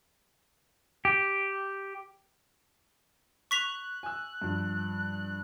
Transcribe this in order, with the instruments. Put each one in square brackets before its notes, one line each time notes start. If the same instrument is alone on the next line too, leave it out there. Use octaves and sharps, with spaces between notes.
[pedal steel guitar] G4
[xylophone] C#6 B6 F7 [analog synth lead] F#6
[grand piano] G#5 E6
G2 F3